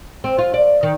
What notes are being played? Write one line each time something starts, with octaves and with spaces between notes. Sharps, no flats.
C4
F4
D5
D#3